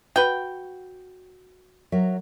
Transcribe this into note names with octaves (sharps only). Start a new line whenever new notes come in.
F#4 B4 G5
F#3 A#4 E5